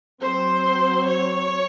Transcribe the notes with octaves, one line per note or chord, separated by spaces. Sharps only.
F#3 C4 C5
C#5